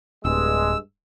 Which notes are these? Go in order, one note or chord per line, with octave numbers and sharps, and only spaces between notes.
D1 G2 G#3 E6